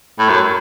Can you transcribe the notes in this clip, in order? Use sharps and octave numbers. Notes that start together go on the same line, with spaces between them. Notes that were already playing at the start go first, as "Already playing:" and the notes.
A2
F#2